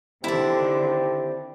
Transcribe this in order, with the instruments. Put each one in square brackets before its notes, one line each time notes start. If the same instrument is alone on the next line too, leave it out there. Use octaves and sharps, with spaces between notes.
[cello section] D3 D#3 [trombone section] C4 D4 G4 [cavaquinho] E4 D5